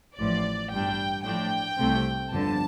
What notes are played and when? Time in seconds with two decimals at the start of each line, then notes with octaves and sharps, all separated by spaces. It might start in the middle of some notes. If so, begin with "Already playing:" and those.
0.17 A1 A2 F3 D5
0.71 G1 G2 G3 D4 G5
1.24 A2 F3 D4 G5
1.77 C2 C3 A3 C4
2.30 G1 F2 D3 A5